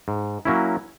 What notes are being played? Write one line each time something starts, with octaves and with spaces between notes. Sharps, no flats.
G#2
F#3 A#3 C#4 E4